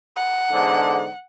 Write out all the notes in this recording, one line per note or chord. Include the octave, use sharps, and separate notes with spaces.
F#5
E2 G#2 D3